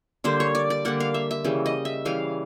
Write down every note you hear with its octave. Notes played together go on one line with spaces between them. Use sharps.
D3 G3 A#3 C5
C#5
D5
D5
D3 G3 A#3 F#5
F5
E5
E5
C#3 E3 G3
D#5
E5
C#3 E3 G3 F5